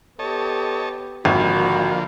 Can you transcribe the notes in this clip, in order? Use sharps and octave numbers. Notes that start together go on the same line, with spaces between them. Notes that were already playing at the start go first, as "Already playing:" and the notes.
B3 G4 A4 C#5 D#5 A5
G#1 D3 F3 A#3 F#4 B5